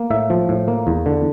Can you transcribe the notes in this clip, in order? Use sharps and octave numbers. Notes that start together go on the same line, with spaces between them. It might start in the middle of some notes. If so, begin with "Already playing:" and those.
Already playing: A#3
A2 E5
F3
A2
A#3
E2
D3